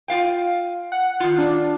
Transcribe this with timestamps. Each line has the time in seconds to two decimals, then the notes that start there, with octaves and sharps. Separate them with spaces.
0.08 F4 F5 G5
0.92 F#5
1.20 D#3 F4
1.38 D4